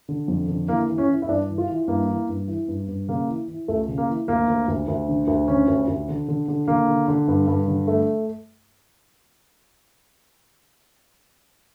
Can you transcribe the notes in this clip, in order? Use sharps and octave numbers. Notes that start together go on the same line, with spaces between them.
D3
F2
D3
E3 A#3
E3
C#4
E3
E4
G2 D4
E3
F4
E3
G2 A#3
E3
G2
E3
G2
G2
C#3 A#3
E3
E3
C#2 A3
C#3
A#3
E3
D2 A#3
D2
D2
D2
D3
D2
D3 C#4
D2
D2
D3
D3
D3
D3 A#3
D3
D3
G2
G2
D3
A3